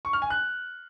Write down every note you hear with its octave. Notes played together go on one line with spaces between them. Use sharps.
C#6
F6
G#5
F#6